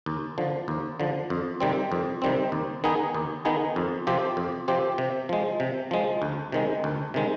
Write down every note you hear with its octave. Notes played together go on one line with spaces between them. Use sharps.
D#2
D3 F3
D#2
D3 F3
F2
C3 D#3 G3 C4
F2
C3 D#3 G3 C4
D#2
D#3 B3 D#4 G#4
D#2
D#3 B3 D#4 G#4
F2
C3 F3 C4 G4
F2
C3 F3 C4 G4
C3
F3 G#3
C3
F3 G#3
D2
C3 D#3 G#3
D2
C3 D#3 G#3